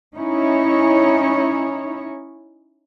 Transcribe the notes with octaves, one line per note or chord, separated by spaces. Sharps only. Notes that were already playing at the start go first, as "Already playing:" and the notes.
C#4 D#4 E4 C#5